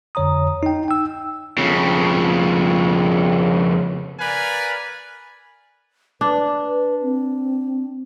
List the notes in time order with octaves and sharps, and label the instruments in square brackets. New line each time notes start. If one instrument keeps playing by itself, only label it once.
[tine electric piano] F2 D3 C#5 A#5 D#6
D#4 G5
G5 E6
[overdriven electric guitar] F2 C#3
[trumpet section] A#4 B4 D5 F5 G#5
[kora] D4 [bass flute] B4
[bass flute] C4